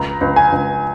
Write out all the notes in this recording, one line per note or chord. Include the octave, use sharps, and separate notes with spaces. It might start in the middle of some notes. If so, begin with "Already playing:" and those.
Already playing: C#2 A#5
C#2
G#5
C#2